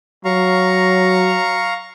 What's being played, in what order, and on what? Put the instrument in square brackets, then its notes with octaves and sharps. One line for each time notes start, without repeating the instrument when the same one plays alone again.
[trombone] F#3 [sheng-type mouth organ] F5 A#5 C#6